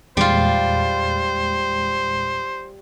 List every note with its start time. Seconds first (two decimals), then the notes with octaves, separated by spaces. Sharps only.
0.17 E2 A#2 G3 G#3 F4 C5